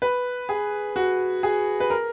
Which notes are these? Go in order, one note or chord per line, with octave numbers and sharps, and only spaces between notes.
B4
G#4
F#4
G#4
B4
A#4